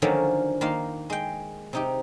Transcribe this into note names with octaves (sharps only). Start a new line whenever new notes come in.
D3 D#3 F3 F#3 A#3 C#4
D#3 A#3 F5 C6
G#3 G5
C3 D#4 G4